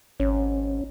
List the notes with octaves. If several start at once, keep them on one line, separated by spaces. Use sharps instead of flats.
G#1 C#4